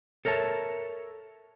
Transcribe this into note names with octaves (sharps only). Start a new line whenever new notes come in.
A4 A#4 C#5 E5 A5